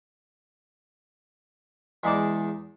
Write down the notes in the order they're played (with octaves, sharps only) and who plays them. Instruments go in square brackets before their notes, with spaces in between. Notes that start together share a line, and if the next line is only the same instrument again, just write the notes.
[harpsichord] E2 G#3 D#4 D5 A5 D6